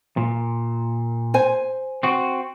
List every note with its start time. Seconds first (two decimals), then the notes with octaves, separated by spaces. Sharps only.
0.17 A#2
1.34 C5 G#5
2.03 C4 F#4